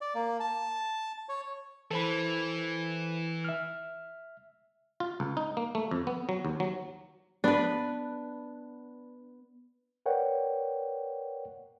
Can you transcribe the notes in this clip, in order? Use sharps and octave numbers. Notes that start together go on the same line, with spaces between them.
D5
A#3
A5
C#5
E3 A4 C5 B5
E5 F6
F4
C#2
D#4
A#3
A3
F2
B3
F#3
D#2
F#3
B3 D4 B4
A#4 B4 C#5 D5 F#5 G5